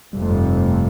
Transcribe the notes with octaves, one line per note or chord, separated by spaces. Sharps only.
F1 F2 C3 G3
A3
G2 G3